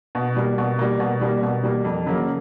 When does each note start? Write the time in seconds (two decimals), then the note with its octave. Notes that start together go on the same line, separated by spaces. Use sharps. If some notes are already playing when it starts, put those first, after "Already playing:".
0.15 B2
0.36 G3 A#3
0.58 B2
0.79 G3 A#3
1.00 B2
1.21 G3 A#3
1.43 B2
1.63 G3 A#3
1.84 F2
2.06 C#3 F#3 A#3